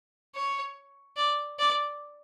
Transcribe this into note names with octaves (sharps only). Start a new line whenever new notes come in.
C#5
D5
D5